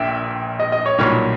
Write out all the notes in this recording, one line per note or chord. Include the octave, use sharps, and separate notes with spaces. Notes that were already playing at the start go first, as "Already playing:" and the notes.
Already playing: A#1 A#2 E5 G5
D#5
D#5
C#5
B1 A#2 G3 C#5